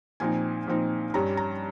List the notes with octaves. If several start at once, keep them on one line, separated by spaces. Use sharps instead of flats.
A#2 F3 C4 D#4 G#5
A#2 F3 C4 D#4
G2 G3 C#4 A#5
A#5